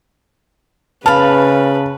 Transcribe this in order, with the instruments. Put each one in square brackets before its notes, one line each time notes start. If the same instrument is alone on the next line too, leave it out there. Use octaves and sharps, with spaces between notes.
[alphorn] C#3 [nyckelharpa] B4 [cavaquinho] F5 B5 [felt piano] A5